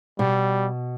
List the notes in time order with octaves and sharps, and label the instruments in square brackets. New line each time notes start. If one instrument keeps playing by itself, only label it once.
[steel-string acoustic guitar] B2 [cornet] G3